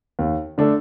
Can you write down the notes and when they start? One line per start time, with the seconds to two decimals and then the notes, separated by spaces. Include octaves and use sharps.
0.19 D#2
0.58 D3 A3 D4 A4